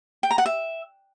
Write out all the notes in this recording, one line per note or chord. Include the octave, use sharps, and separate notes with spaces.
G5
A#5
F#5
E5